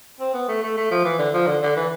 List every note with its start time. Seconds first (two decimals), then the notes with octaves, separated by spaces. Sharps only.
0.20 C4
0.34 B3
0.48 A3
0.63 A3
0.77 A3
0.91 F3
1.05 E3
1.19 D3
1.34 F3
1.47 D3
1.62 D3
1.76 E3